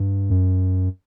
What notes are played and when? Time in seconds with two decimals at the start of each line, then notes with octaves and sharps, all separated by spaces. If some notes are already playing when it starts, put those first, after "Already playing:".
Already playing: G2
0.30 F#2